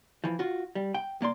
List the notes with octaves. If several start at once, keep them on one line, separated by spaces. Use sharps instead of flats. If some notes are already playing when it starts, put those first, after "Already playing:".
E3 F3
F4 F#4
G3
G5
C2 A#3 D5 C6